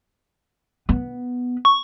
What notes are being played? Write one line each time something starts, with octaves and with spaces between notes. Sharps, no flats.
B3
C#6